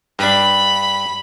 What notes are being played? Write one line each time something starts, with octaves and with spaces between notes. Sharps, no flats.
G2 D4 B5